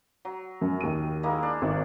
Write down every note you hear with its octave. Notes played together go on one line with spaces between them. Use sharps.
F#3
F#2
D#2 D#7
G#3 A#3 E4
D4
G#1